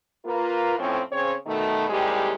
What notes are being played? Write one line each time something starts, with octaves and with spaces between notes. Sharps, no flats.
A#3 F4 B4
F2 A2 F3 C4 C#4
C#3 C4 C#5
B2 D#3 A3
D#2 A2 C3 G3 G#3 G4